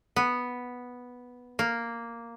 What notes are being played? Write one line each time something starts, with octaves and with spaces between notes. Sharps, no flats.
B3
A#3